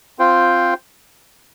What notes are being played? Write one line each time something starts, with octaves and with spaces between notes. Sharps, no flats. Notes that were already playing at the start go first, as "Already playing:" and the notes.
C4 F4 C5 G5